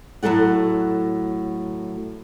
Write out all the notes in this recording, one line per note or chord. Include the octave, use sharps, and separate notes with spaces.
A2 F#3 A3 A4 F#5